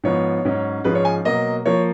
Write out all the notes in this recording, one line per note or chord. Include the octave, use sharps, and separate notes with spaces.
G#2 F3 B3 C#5
G#2 F#3 C#4
G#2 F3 G#3 C#4 B4
C#5
G#5
B2 F#3 A#3 D#5
F3 A#3 C#5